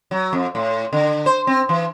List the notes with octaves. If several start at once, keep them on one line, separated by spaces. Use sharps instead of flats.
F#3
F2
A2
D3
C5
C4
E3